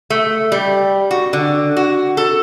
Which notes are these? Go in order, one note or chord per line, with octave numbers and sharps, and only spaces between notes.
A3
G3
F#4
D3
F#4
A4